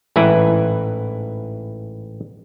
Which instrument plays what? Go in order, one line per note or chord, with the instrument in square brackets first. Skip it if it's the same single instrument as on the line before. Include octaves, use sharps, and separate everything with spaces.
[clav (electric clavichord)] A1 G#2 E3 E4 B4